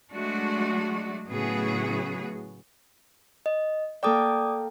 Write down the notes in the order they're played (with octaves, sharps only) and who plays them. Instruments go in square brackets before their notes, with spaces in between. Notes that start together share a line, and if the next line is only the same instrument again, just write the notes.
[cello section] F#3 G#3 A3 D4 F#4
A2 C#3 F#3 B3 F#4 G#4
[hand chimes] D#5
[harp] A#3 A4 G5 [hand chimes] D5 D6 D#6